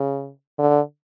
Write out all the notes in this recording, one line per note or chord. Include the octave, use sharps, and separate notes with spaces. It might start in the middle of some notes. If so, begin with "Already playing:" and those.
Already playing: C#3
D3